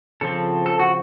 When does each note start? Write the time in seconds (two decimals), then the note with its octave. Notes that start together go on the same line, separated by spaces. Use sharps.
0.21 C#3 F3 C4 A4
0.66 A4
0.80 F#4